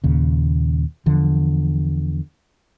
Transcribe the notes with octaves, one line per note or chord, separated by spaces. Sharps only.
D#2 A#2 C#3
E2 D3 F3